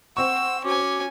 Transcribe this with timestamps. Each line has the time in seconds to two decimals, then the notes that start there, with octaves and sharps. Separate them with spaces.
0.17 C4 F#5 C#6 E6
0.64 C#4 F#4 G#5 D6